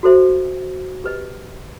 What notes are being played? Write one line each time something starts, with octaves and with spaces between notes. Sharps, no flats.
F#4 A4 C5 E5
G4 B4 D#5